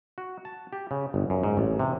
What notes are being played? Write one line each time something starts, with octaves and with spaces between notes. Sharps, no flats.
F#4
A5
G4
C#3
G1
F#2
G#2
A1
C3